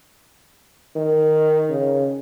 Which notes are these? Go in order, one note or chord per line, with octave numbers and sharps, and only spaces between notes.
D#3
C#3